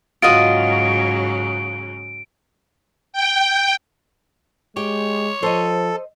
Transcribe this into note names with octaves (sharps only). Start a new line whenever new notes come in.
G#2 C#3 F#3 F4 F#4 D#5 D7
G5
G#3 G4 C#5
F3 A4 C5 D#5